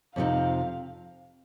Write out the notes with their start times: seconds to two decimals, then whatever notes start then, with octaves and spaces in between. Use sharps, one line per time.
0.16 F2 C3 F3 C4 D#4 F5